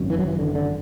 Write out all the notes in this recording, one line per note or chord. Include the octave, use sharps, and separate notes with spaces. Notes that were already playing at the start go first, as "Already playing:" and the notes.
Already playing: G#1 F#2
E3
F#3
E3
D3
D3